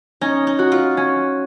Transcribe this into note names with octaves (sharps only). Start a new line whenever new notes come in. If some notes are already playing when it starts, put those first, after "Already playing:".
C#4 D#4
D#4
F#4
F4
C#4